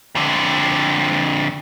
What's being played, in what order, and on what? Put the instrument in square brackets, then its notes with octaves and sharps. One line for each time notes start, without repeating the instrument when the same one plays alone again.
[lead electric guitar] F2 D3